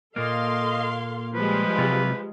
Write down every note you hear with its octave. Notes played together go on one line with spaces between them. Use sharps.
A#2 A#3 A4 D#5 F5 C6
F3 G3 G#3 B4
C3 F#3 F4